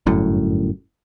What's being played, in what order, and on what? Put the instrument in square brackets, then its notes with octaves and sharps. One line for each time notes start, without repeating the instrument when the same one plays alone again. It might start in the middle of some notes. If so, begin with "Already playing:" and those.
[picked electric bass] G1 F#2 A2